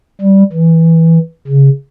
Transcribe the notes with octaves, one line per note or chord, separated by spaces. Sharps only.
G3
E3
C#3